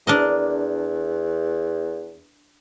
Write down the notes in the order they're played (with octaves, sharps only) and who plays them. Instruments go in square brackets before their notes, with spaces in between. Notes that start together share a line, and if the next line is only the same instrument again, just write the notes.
[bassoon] E2 [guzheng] D4 A#4 D#5